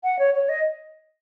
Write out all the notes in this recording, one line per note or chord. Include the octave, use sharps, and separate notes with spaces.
F#5
C#5
C#5
D#5